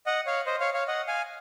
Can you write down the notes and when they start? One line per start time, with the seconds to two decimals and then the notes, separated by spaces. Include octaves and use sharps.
0.06 D#5 F#5
0.26 C#5 F5
0.46 C5 D#5
0.60 C#5 F5
0.74 C#5 F5
0.87 D#5 F#5
1.07 F5 G#5